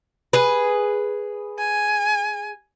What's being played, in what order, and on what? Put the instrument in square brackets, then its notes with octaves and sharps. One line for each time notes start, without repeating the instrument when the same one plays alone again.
[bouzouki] G#4 B4
[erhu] G#5